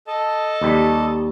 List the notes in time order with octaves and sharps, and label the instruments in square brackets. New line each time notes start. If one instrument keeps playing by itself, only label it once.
[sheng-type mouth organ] A4 D#5 A5
[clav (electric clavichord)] D#2 G3